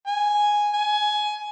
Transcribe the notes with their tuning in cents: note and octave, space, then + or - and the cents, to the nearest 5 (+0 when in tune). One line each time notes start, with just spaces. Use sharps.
G#5 +0
G#5 +20